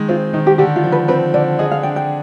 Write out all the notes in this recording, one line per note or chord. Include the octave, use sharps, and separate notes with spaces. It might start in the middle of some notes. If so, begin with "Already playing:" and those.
Already playing: D#3 G#3
C4 F4
D#3 D#4
G4
D3 G4
F4
F3
B4
C4 B4
D3 D5
G#4 D#5
F5
D4 G5
G5